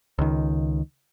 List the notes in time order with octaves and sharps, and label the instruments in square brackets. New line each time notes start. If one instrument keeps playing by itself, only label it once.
[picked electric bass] C#2 D#3